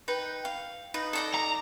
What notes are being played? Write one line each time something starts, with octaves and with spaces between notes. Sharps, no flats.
D#4 B4 G5
F5
D#4 B4
A4 D5 D#5
A#5